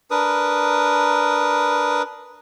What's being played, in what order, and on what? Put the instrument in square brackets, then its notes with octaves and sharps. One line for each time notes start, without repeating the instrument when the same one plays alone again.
[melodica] D4 A#4 B4 D#6